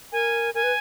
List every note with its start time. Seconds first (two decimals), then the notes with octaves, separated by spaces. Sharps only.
0.12 A#4 G#5
0.54 A#4 G#5
0.63 B4